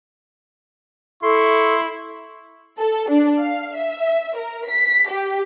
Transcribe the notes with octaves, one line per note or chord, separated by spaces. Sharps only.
E4 A4 C6 C#6
A4
D4
F5
E5
A#4
B6
G4